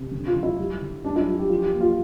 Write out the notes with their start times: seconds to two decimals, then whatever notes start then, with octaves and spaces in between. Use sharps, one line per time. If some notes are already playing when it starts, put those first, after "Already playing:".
Already playing: C3
0.11 D3
0.27 F4
0.35 D3
0.43 E4
0.59 G3
0.81 D3
1.05 G3 D4
1.16 E4
1.27 G3 F4
1.39 G4
1.49 F3 F4
1.59 G4
1.74 A#3
1.81 F4